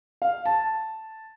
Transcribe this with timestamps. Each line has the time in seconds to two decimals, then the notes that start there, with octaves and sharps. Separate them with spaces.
0.22 F5
0.46 A5